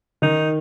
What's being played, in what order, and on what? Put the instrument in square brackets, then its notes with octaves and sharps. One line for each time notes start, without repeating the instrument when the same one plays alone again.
[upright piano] D#3 [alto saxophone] D#4